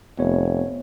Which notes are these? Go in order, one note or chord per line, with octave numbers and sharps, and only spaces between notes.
F1 B3 C#5